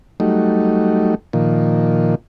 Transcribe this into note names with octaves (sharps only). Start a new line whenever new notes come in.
F#3 G3 A3 D#4
A#2 D#3 F3